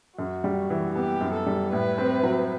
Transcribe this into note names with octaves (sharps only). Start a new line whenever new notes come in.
F#2 F#4
G3
E3
B3 G4
F#2
A4
G3
A2 B4
C4
F#3